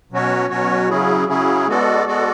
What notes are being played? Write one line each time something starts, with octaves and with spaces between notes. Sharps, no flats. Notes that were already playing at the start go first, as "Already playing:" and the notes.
B2 F#3 C#4 F#4 C#5
B2 F#3 C#4 F#4 C#5
C#3 F#3 C#4 E4 G#4
C#3 F#3 C#4 E4 G#4
G#3 B3 F#4 A4 D5
G#3 B3 F#4 A4 D5